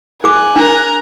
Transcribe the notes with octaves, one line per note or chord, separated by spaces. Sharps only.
G#4 G#5 D6 F#6
D4 A#4 A#5